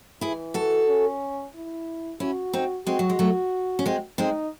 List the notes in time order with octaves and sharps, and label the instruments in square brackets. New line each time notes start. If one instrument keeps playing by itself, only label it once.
[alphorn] E3 [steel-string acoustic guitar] E4 G#4
[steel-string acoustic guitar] F#4 A4
[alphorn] C#4
E4
[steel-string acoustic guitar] C#4 E4 [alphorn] F#4
[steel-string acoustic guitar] C4 D#4
[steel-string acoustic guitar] G#3 C4 [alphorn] F#4
[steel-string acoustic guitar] F#3
G#3
F#3 A3
C#4
G#3 C4
[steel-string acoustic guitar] G#3 C4 [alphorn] D#4